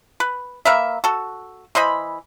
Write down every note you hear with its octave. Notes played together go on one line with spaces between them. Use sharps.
B4
A#3 A#4 B4 E5
F#4 A4
E3 C5 D#5 B5